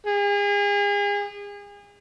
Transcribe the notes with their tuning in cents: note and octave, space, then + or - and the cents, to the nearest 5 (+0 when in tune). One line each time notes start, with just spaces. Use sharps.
G#4 -35